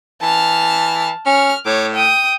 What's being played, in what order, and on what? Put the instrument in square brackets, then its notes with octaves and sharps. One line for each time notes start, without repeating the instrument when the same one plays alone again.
[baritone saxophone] E3 [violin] A5 F6
[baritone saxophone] C#4 [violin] F6
[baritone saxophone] A2 [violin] C#5 D6
[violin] G5 D#6